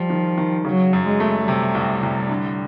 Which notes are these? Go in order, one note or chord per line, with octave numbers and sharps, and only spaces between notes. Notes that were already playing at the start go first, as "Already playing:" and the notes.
Already playing: F3 G3
D#3
D#3
C#3 F#3
F#2
G#3
A3
C3 G3
C2
C2
D3